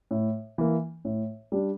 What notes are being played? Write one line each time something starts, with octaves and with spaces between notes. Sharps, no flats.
A2
E3 A#3
A2
G3 D4